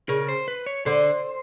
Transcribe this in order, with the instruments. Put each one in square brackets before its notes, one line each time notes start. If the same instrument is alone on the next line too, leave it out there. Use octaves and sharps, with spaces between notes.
[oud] C#3 [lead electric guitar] A#4
[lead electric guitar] C5
B4
C#5
[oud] D3 [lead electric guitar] C5